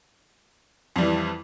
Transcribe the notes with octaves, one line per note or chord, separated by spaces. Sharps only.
F2 E3 G3